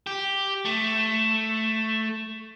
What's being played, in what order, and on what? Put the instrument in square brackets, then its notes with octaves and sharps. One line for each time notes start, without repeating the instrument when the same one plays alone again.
[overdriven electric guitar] G4
A3